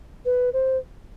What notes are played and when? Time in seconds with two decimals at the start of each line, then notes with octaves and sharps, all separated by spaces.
0.25 B4
0.53 C5